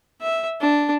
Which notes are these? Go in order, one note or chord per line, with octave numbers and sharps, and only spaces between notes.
E5
D4